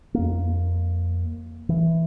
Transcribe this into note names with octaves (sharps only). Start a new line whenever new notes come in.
F2 A#3
E3